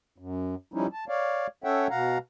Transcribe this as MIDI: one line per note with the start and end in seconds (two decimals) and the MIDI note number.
0.18 0.55 42
0.74 0.87 53
0.74 0.87 55
0.74 0.87 61
0.74 0.87 63
0.74 0.87 64
0.93 1.05 81
1.09 1.47 73
1.09 1.47 74
1.09 1.47 77
1.64 1.87 61
1.64 1.87 69
1.64 1.87 73
1.64 1.87 76
1.64 1.87 78
1.64 1.87 79
1.90 2.18 47
1.90 2.18 77
1.90 2.18 78
1.90 2.18 82